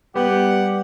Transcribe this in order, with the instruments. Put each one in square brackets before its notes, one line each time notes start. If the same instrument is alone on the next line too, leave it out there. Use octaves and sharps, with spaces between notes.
[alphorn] G3 [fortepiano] B3 [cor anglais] G4 [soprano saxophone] F#5